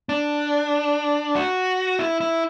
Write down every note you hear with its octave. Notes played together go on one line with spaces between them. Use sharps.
D4
F#4
E4
E4